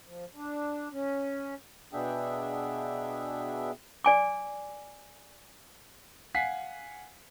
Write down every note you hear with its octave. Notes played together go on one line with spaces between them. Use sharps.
F3
D4
C#4
B2 B3 D4 G#4 E5 G5
D5 G#5 D6
F5 F#5 G#5 B6 C7